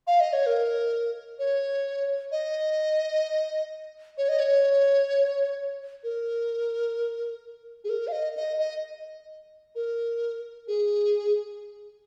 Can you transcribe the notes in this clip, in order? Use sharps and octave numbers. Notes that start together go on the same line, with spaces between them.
F5
D#5
C#5
A#4
C#5
D#5
C#5
D#5
C#5
A#4
G#4
A#4
F5
D#5
D#5
D#5
A#4
G#4